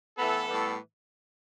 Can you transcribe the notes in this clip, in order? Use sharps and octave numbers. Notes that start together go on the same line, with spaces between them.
A2 E3 B3 A4
A2 E3 G3 B3